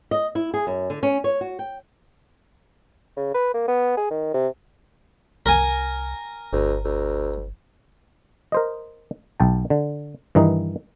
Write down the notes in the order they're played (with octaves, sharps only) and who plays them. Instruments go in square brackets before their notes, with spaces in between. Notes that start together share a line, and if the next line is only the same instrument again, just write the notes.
[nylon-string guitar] D#5
E4
G#4
F#2
D3
C#4
C#5
F#4
G5
[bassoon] C#3
B4
A#3
B3
G#4
D#3
C3
[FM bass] C2 [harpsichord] A#4 G#5
[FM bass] G1 [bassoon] D2
[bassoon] D2
[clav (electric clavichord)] A#4 C5 D#5
B1 G5 A5
D3
G2 D#3 E3 D#4